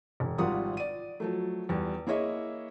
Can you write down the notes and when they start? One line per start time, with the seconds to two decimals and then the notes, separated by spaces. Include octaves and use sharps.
0.20 E1
0.38 G#1 F3 G3 F4 F#5 D#6
0.77 D5 D#7
1.20 F3 F#3 A3
1.69 E2 G3
2.07 A#3 E4 G#4 C#5 D#5 E5